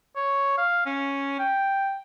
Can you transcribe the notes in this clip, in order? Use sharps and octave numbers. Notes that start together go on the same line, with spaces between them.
C#5
F5
C#4
G5